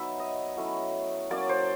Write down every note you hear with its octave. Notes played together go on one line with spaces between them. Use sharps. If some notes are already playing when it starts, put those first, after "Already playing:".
Already playing: F#3 B3 D#4 E5
D#5
F#3 A3 C#4 E4
F#3 A#3 C#4 D5
C5